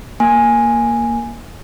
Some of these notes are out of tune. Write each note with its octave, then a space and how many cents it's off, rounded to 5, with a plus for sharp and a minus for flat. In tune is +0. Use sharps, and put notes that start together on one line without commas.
A#3 +0 G#5 +0